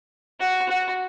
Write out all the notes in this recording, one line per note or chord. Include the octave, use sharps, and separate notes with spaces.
F#4
F#4